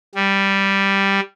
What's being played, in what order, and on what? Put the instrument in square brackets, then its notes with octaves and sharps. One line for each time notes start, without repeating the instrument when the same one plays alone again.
[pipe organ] G3